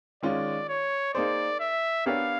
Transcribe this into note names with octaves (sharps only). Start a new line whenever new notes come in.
D#3 G#3 C#4 F4 D5
C#5
A#3 D#4 G#4 C5 D5
E5
B3 D4 G4 A#4 C#5 F5